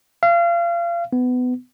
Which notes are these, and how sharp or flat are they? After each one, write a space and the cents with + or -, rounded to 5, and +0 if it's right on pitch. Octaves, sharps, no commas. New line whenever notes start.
F5 -30
B3 +20